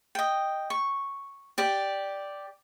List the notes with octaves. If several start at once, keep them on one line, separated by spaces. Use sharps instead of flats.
D#5 G5
C#6
G4 D5 G5